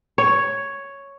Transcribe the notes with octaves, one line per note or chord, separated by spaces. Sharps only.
C#5